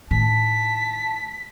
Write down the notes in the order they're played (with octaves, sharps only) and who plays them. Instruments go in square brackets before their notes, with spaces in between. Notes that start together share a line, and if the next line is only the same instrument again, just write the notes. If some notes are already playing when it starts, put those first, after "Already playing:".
[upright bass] A2 D#3 [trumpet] A5 [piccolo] B6